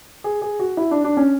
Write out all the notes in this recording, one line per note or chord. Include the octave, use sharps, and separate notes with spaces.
G#4
G#4
F#4
E4
D4
D4
C#4